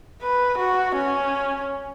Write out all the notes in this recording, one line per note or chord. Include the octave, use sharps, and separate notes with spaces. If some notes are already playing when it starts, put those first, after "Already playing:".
B4
F#4
C#4